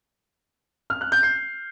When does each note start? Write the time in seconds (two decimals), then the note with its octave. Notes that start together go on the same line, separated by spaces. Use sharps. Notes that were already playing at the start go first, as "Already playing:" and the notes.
0.90 F6
1.01 F#6
1.12 G6
1.23 C7